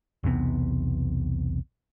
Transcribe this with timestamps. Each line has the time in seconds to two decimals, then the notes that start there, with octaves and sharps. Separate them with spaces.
0.23 B1 E2 C3 B3